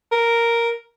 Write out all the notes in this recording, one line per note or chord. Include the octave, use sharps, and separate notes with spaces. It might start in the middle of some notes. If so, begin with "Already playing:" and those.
A#4